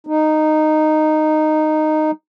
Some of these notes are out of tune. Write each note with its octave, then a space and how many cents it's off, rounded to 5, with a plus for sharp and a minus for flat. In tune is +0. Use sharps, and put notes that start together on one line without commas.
D#4 -10